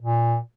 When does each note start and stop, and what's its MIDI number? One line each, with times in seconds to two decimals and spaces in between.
0.02 0.38 46